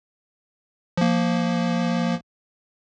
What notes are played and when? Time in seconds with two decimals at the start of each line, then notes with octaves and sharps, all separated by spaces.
0.97 F3 A#3